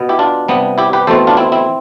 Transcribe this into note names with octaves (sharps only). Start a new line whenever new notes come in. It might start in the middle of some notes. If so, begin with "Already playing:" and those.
Already playing: B2 B3
E4 G4
D4 F4
C3 G3 B3
E4 G4
G4 B4
E2 B2 A3 C4 A4 C5
D4 F4
C4 E4
C4 E4